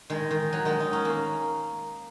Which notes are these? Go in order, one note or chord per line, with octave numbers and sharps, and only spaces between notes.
D#3 G#3
D#3
F#3
D#3 G#3
D#4
C#4
A#3